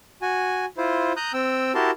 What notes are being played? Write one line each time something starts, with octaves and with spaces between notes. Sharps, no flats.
F#4 G#5
E4 F4 C5
A#5 D#6 F#6 G6
C4 G5 E6
E4 F#4 G4 A#4 A5 C6